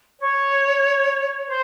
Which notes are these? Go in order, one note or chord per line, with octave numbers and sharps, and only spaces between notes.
C#5
C5